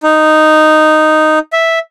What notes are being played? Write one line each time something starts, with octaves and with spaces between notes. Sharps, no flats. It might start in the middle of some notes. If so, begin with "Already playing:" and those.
D#4
E5